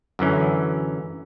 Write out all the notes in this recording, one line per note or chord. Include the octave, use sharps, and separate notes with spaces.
F#2 D3 E3 C#4